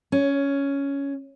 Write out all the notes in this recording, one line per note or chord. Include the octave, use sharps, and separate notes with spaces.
C#4